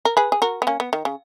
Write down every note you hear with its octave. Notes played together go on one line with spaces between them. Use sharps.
A#4
G#4 B4
G#4
F#4 A#4
B3
A#3 C#4
B3
D#3
C#3